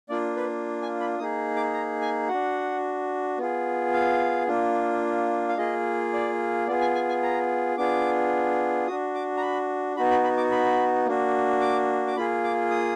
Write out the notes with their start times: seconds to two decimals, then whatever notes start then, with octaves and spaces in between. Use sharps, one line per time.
0.09 A#3 D4 F4 D5
0.37 B4
0.82 G#5
1.00 B5
1.19 A#3 D#4 G#4 D#6
1.56 D6
1.73 A#5
2.01 G#5
2.28 D4 F#4 F#5
3.38 B3 F4 G#4
3.94 F5
4.48 A#3 D4 F4
5.49 F5
5.57 A#3 F4 G#4 D#5
6.13 D5
6.67 B3 F4 G#4 D5
6.81 G#5
6.95 G#5
7.09 G#5
7.23 A#5
7.77 B3 D4 F4 G#4 D6
8.87 F#4 D#6
8.91 D4
9.15 D6
9.37 A#5
9.42 B5
9.96 B3 D#4 F#4 B5
10.11 B5
10.24 B5
10.37 D6
10.51 B5
11.06 A#3 D4 F#4
11.61 D6
12.07 D6
12.16 A#3 F4 G#4 B5
12.44 D6
12.71 D#6